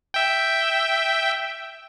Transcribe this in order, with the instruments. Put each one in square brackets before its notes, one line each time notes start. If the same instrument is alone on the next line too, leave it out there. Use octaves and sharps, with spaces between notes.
[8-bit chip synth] E5 G5